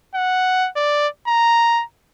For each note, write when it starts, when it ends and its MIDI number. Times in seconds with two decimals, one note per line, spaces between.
0.14 0.68 78
0.76 1.07 74
1.28 1.82 82